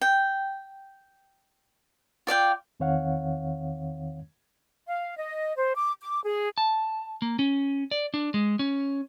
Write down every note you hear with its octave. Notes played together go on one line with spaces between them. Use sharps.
G5
F4 D5 F5 G5
E2 D#3 C4 C#5 F5 F#5
F5
D#5
C5
D6
D6
G#4
A5
A#3
C#4
D5
D4
G#3
C#4